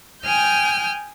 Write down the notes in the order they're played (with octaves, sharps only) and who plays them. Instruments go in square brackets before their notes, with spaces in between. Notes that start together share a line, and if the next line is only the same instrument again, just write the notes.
[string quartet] G5 G#5 D#6 F6 G6